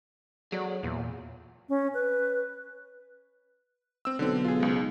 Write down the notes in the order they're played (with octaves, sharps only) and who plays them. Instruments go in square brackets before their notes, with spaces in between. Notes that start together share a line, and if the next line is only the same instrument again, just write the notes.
[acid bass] F#3 [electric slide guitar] G#4 A4 D5
[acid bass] E2 [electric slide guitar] A#2
[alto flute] C#4
B4
[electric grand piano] C4 E6
[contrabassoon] B1 [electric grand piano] D3 C4
[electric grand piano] F4 G#4
C#2 G#3